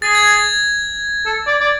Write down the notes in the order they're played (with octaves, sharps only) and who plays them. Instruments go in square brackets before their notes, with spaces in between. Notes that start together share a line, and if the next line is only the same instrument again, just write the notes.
[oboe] G#4 [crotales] A6
[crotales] G#6
A6
[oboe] A4
D5
D5